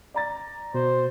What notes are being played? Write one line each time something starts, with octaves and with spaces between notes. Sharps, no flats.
D5 A#5 A6
B2 C5